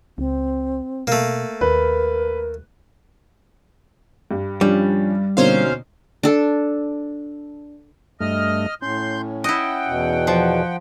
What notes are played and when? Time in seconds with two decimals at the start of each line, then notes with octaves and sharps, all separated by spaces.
0.18 C#2 C4
1.07 B2 A3 A#3
1.61 D#2 A#4 B4
4.31 G2
4.61 F3 G3 C#4 D4
5.37 B2 D3 A#3 C4 C#4 D#4 C5 F5
6.23 D4 A4
8.21 G2 A3 D#5 F6
8.82 A2 C#4 C6 G6
9.44 E4 D#5 F#5 G5
9.87 E2 B2
10.27 F3